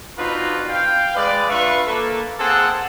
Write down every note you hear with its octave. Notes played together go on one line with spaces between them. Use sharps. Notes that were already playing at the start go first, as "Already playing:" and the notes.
C4 D4 D#4 F4 F#4 B4
F5 G5
G#3 B4 D5
D4 F4 B4 E5 F5 C#6
A#3 A4 B4
A#3 C4 G#4 A4 F#5